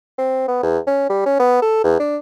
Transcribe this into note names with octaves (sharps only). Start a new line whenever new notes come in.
C4
B3
E2
C#4
G3
C#4
B3
A4
E2
D4